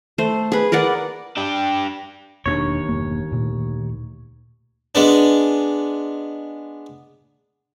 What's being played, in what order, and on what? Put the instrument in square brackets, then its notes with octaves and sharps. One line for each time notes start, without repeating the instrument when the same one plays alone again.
[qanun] A3 C5
G#4 B4
A#4 B4 D5 F#5
[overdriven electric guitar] D4 G4
[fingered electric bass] E1 D4 [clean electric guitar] D#2 C3 C#5
[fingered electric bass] E1 G2 A#3
D2 A#2
[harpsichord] G#3 B3 D4